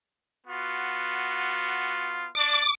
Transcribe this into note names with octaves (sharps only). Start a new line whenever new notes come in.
B3 F4 F#4
D4 D5 D6